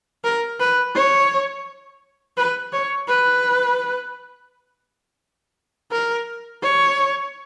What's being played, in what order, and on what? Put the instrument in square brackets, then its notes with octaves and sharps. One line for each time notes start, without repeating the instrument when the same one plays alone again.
[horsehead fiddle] A#4
B4
C#5
B4
C#5
B4
A#4
C#5